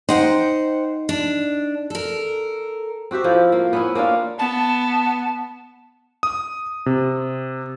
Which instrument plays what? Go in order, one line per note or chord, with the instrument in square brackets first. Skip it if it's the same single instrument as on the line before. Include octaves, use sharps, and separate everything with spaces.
[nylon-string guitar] D#4 [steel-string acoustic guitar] C5 F#5 G5
[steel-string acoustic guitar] D4
A4 A#4
[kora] C4 F#4 G4 E5
F3 E4 A4
A#3
B3 C#4 E4
A#3 C#4 D4 F4
[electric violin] B3 [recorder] A5
[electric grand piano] D#6
C3